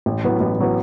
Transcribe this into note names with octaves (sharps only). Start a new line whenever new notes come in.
A1
A2 F#3 B3
A1
A2 F#3 B3